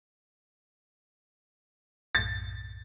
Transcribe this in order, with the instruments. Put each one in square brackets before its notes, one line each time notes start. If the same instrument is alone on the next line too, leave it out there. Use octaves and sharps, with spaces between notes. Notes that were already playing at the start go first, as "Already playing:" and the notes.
[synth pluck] B1 F#2 A2 [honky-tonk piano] A6